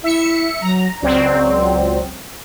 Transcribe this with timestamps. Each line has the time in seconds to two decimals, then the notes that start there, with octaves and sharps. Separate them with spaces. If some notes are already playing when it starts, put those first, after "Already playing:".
0.04 E4 E5 C#7
0.62 F#3 A#5
1.02 C#2 F#3 C4 D5